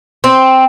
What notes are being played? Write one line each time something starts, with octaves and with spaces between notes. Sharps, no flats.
C4